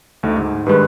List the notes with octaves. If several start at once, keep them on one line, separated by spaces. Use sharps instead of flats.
D2 A3 D#4
G#2
G2 D#3 G#3 B4